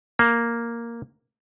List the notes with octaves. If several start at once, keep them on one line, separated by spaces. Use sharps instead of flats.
A#3